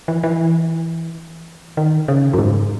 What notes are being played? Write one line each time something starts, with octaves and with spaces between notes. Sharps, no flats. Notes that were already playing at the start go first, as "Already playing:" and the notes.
E3
E3
D#3
C#3
F#2
G#2